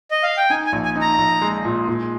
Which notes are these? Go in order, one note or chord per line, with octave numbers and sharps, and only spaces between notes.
D#5
F5
G5
D#4 G#5
G#5
A#1
G#5
D#4
A#5
A#1
G#3
A#2
A#2